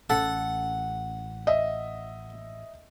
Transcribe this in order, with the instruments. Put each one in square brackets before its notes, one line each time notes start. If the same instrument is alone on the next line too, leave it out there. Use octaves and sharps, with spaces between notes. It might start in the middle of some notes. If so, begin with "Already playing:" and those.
[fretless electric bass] A1 C#4 [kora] A4 [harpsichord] F#5
[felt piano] D#5 E5